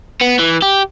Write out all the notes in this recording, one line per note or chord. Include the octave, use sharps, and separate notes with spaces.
B3
E3
G4